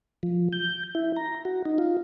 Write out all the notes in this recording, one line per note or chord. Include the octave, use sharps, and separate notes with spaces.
F3
G6
E4
A#5
F#4
D#4
F4